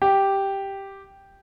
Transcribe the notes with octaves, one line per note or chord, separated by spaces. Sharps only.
G4